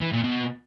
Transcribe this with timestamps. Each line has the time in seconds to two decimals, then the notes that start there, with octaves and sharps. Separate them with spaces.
0.01 E3
0.13 A#2
0.24 B2